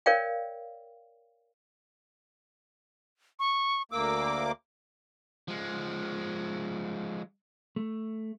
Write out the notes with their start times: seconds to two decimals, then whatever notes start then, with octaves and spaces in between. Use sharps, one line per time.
0.06 A#4 C#5 D5 F5 G5
3.39 C#6
3.92 D2 A#3 D6 E6
5.48 F3 G#3
7.76 A3